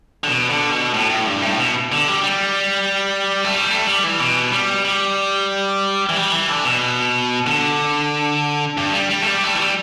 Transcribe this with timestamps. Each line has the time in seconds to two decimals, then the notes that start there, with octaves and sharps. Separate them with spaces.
0.24 D3
0.28 B2
0.50 D3
0.71 B2
0.94 A2
1.10 A2
1.27 G2
1.42 A2
1.59 B2
1.92 D3
2.08 G3
2.24 G3
3.44 A3
3.55 G3
3.71 A3
3.87 G3
4.04 E3
4.20 B2
4.52 G3
4.85 G3
6.09 E3
6.17 G3
6.32 E3
6.49 D3
6.65 B2
7.47 D3
8.77 G2
8.94 G3
9.10 G3
9.22 A3
9.27 G3
9.43 A3
9.54 E3
9.59 G3